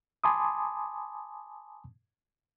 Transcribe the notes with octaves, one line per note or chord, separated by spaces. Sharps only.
G#5 A5 B5 C6 D6 D#6